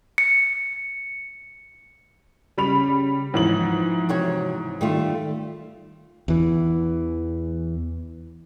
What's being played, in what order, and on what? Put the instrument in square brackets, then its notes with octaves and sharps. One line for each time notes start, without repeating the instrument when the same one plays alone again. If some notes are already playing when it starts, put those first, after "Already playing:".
[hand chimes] C#7
[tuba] C#3 [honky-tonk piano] G3 B5 F7
[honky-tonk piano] G#2 E3 F#7 [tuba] F3
[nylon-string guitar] C3 F#4 C#5
[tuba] D#3 [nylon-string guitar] G3 A3 F4
[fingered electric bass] E2 E3